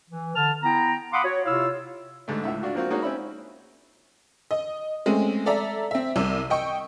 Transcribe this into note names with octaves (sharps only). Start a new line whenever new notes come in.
E3
D3 A5 F6
B3 E4 G5 A#5
F5 F#5 B5 C6 D6 D#6
F#4 C#5
C3 E4 F4 C#5 F5 E6
G#2 D3 A3
C#2 A2 E5
D4 F4 F#4
F3 A#3 C4 F4 F#4
G#3 A#3 D#4 F#4 C#5 D#5
C4 C#4 E5 B5
D#5
G#3 A3 C4 C#4
A4 D5 E5 A#5
C4 E5
C2 C3 E6
D#5 G5 C#6